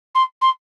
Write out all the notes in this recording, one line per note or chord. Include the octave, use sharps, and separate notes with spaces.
C6
C6